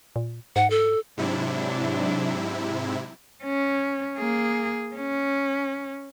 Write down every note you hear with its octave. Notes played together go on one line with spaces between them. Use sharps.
A#2
G#2 F#5
A4
G#2 C3 F#3 D4 E4
C#4
A#3 G#4
C#4